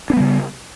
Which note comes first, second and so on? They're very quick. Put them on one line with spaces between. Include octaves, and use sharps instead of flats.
D4 B3 G3 C#3